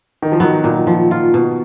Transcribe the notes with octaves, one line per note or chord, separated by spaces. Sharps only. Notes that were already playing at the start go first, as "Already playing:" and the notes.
D#3
F3
D#3 F#3 B3
A#2
F3
F4
B2